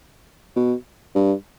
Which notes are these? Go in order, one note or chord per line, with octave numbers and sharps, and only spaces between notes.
B2
G2